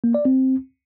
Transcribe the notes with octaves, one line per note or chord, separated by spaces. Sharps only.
A#3
D5
C4